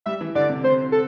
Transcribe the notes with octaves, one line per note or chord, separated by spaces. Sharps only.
G3 E5
E3
D3 D5
C3
C3 C5
A4